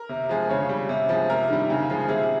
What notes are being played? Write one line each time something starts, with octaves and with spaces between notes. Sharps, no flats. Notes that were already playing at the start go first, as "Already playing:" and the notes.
Already playing: A#4
C3
F3 G#3
C#3 C#5
G3
C3
F3 G#3
C3 A#4
D#3 G3
C#3
F3 G#3
C3 G#4